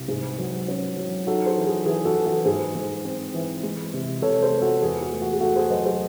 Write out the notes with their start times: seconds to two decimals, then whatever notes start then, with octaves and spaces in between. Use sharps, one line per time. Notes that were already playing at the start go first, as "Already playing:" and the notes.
Already playing: C2
0.08 G#2 G#4
0.38 F#3
0.68 C#4
0.97 F#3
1.27 D#4 F#4 A4
1.46 G#4 C5
1.57 E3
1.67 G#4
1.85 E3 G#4
2.05 F#4 A4
2.15 E3
2.26 F#4 A4
2.45 G#2 G#4 C5
2.75 G#2
3.05 C4
3.34 E3
3.63 G#3
3.93 C3
4.22 C3 A4 C#5
4.42 G#4 C5
4.52 G#3
4.62 F#4 A4
4.82 E2 G#4
5.01 F#4
5.12 A3
5.21 F#4
5.33 G#4
5.41 A3 F#4 A4
5.56 G#4 C5
5.70 F#3 C5 D#5
5.85 G#4 C5